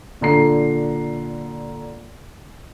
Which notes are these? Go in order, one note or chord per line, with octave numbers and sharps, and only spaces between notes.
A#2 D3 A#5 C7